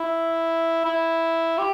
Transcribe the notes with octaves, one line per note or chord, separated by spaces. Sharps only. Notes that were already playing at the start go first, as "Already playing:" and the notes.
Already playing: E4
E4
G4